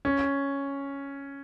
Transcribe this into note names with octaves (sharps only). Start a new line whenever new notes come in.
C#4